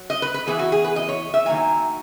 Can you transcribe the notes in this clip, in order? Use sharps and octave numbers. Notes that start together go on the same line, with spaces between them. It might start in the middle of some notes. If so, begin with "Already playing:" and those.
Already playing: F#3
D#5
B4
B4
E3 B3 E4 G#4
F#4
G#4
B4
D#5
C#5
E5
D#3 F#3 A#3 G#5